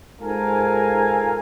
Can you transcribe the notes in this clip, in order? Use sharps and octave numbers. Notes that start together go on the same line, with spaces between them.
G#2 F4 A4 A#4 F5 G#5